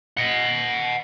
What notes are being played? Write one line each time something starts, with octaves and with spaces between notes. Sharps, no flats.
D#5 F#5